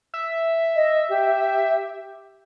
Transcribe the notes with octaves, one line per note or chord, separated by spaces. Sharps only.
E5
D#5
G4